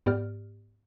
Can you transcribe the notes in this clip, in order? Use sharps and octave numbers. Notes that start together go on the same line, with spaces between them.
G#2 B3 G4 D5 F6